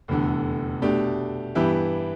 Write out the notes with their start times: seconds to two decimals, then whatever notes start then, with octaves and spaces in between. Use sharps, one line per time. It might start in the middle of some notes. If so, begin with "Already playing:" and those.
0.08 F1 E2 D3
0.82 B2 A3 D4 G4
1.55 G2 E3 B3 E4 G4